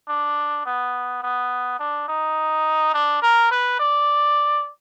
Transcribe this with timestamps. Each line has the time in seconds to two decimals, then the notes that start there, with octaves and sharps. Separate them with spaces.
0.08 D4
0.66 B3
1.23 B3
1.80 D4
2.08 D#4
2.94 D4
3.22 A#4
3.51 B4
3.80 D5